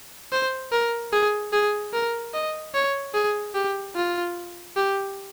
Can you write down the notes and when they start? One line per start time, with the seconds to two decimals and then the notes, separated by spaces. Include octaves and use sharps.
0.32 C5
0.72 A#4
1.12 G#4
1.53 G#4
1.93 A#4
2.33 D#5
2.74 C#5
3.14 G#4
3.54 G4
3.96 F4
4.76 G4